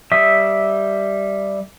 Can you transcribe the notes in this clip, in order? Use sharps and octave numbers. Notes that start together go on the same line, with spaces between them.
G3 E5 D#6